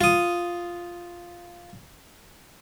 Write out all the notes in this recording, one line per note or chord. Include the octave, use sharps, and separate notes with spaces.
F4 D#6